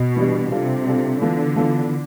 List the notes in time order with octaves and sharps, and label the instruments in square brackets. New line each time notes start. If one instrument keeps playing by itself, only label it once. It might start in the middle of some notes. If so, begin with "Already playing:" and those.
Already playing: [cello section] B2
[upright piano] E3 G3 D4 G4
[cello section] C3 [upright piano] G3 D4 F4 A4
[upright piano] G3 D4 F4 A4
[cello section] D3 [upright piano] E3 B3 F4 A4
[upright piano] E3 B3 F4 A4